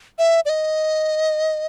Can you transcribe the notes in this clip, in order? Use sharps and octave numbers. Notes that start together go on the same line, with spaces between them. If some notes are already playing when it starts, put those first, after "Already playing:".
E5
D5
D#5